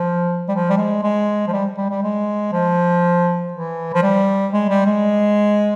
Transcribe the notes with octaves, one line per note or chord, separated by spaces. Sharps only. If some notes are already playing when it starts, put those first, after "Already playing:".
Already playing: F3
G3
F3
G3
G#3
G#3
F3
G3
G3
G3
G#3
F3
E3
F3
G3
G#3
G3
G#3